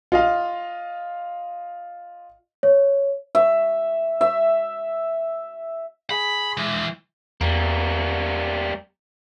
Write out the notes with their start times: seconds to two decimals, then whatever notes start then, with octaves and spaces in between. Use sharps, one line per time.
0.12 F4 D#5 F5
2.63 C#5
3.35 E5
4.21 E5
6.10 G#4 B5
6.57 E3 G#3
7.41 E2 G3 A#3